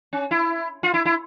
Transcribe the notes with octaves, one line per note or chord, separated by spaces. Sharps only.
C#4
E4
F4
E4
E4